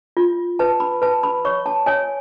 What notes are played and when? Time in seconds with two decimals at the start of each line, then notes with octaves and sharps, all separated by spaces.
0.17 F4
0.59 B4 A5
0.80 B5
1.02 B4 A5
1.23 B5
1.45 C#5 C#6
1.66 A5
1.86 C#5 G#5